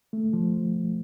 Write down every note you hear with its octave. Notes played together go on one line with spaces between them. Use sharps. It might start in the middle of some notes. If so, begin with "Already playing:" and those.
A3
F3